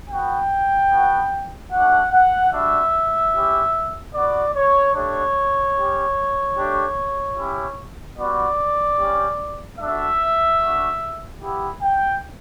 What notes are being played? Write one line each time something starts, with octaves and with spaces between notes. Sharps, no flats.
B3 F#4 G5
B3 F#4
A3 D4 F#4 F#5
F#5
G3 D4 F#4 E5
C#4 E4 G4
B3 F#4 D5
C#5
A3 D4 G4 C#5
C#4 G4
A3 D4 G4
C#4 E4 G4
G3 B3 F#4 D5
G3 C#4 G4
A3 D4 F#4 E5
A3 D4 F#4
B3 E4 G4
G5